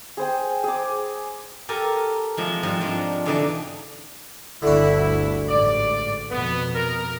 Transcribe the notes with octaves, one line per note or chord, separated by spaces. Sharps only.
G#4 C5 G5
G#4 D6
G4 A4 A#4 G#5
C3 F3 G#3
G#2 F3 G3 D#5 F#5
F3 G#3 C4 D4
B2 D3 E3 D#4 D5 A5
G1 D2 D3 E4 F#4
A1 G#2 D5
F2 B2 B3
A#4